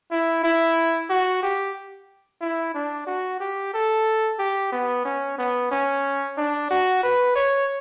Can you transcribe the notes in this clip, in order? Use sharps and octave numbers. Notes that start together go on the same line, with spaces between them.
E4
E4
F#4
G4
E4
D4
F#4
G4
A4
G4
B3
C#4
B3
C#4
D4
F#4
B4
C#5